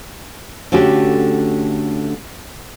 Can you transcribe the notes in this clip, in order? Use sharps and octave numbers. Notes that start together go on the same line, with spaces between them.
D3 A3 C#4 F#4 G4